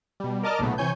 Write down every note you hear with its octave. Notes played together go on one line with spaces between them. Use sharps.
B2 G3
A#4 D5 D#5 A5 D6 F6
B1 A#2 C#3 A3 B3
C3 E3 C#5 G#5 G6